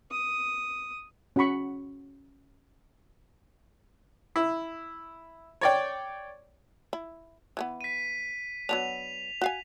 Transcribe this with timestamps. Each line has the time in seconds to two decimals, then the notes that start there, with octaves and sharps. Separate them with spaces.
0.11 D#6
1.36 C#4 F#4 F#5 B5 C#6
4.36 E4
5.61 C#5 D5 G5
6.93 E4
7.57 E3 A3 B3
7.81 B6 D#7
8.69 F#3 B3 D4 F7
9.41 F#4 F5 G#5